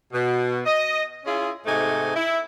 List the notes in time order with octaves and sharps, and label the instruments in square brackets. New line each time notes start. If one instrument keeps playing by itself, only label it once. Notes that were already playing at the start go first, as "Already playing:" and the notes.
[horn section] B2
D#5
C#4 E4 F4 G#4
G#2 C3 A3 D#4 G#5
E4